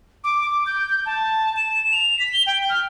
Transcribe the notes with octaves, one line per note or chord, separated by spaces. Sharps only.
D6
D6
G6
A5
E7
F7
B6
G7
G5
F6